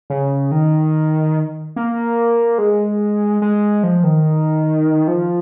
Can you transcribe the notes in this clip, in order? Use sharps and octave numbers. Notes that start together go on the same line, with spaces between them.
C#3
D#3
A#3
G#3
G#3
F3
D#3
F3